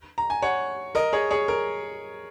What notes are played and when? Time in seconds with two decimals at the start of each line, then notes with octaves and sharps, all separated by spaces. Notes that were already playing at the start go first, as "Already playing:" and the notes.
0.18 A#5
0.30 G#5
0.42 C#5 F#5
0.95 A#4 D#5
1.13 G#4 C#5
1.31 G#4 C#5
1.48 A#4